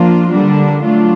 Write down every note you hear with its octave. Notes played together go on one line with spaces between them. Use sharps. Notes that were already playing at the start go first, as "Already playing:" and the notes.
Already playing: F3 A#3 D4 F4
D3 G3 A#3 D4
F#3 A3 D4 F4